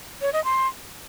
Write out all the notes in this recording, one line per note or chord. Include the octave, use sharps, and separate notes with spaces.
C#5
D#5
C6